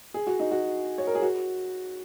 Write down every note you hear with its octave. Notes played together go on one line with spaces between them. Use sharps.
G#4
F#4
D#4
F#4
C#5
A#4
G#4
F#4